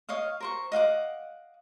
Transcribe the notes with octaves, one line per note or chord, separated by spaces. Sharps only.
C#5 D#5 F5 D#6
A#4 C5 C#6
D#5 F5 F#5 D6